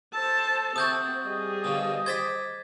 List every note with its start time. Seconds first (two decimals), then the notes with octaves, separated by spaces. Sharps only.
0.14 A4 C5 A5
0.76 C3 C4 F#4 D#6 G6 A6
1.26 G3 G#4 D#5
1.64 B2 D3 F3
2.06 G4 C5 G#6 A6 B6